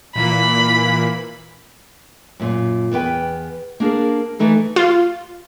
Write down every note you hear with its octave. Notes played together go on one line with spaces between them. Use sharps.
A#2 E3 A#3 B5
F#2 A#2 F4
E2 B3 B4 G5
A#3 D4 G#4 A#4
E3 A3 D#4 A4
F4